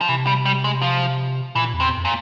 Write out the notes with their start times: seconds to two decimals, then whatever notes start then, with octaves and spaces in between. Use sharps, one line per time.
0.01 F3
0.08 C3 E3
0.27 G3
0.45 G3
0.64 G#3
0.82 F3
1.55 A#2 E3
1.74 E2
1.80 C3
1.92 F2
2.05 A#2